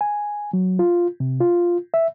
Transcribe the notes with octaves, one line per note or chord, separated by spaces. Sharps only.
G#5
F#3
F4
C3
F4
E5